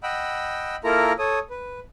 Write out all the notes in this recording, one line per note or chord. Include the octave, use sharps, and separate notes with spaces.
D#5 F#5 G5 B5 E6
A#3 E4 F4 A4 A#4 A#5
A4 C#5 D#6
B4